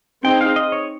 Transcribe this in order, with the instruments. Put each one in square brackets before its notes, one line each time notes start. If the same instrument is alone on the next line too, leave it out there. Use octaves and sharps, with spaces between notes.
[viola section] C4 D#4 G#4 [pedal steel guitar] G5
[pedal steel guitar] F5
D#5
C#5